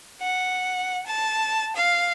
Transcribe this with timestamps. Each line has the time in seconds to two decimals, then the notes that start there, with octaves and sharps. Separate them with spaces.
0.19 F#5
1.06 A5
1.75 F5